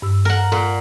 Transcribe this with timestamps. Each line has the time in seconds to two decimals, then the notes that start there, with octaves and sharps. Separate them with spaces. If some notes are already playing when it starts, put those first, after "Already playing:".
0.02 G2 E6
0.25 A#4 F#5
0.52 A#2 A4